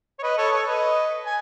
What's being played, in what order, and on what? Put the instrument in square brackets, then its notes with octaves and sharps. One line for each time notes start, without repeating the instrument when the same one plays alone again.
[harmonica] C#5
B4 D#5
A4 C#5
A4 C#5
B4 D#5
G#5